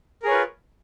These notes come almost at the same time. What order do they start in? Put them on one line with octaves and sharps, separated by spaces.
A#4 G#4 C#5 B4 F4